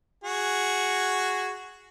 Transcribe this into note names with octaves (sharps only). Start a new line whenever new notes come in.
F#4 G#4